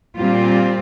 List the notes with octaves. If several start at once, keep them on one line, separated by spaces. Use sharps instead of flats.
A#2 G3 C4 F4